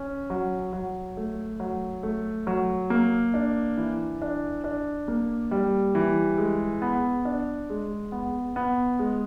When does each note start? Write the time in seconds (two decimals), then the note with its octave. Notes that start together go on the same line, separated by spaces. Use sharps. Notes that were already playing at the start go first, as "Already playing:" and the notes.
Already playing: C#4
0.30 F#3
0.73 F#3
1.17 A3
1.60 F#3
2.03 A3
2.47 F#3
2.90 A#3
3.34 D4
3.77 E3
4.22 D4
4.64 D4
5.08 A#3
5.51 G3
5.95 E3
6.38 G#3
6.82 B3
7.25 D4
7.70 G#3
8.12 B3
8.56 B3
8.99 G#3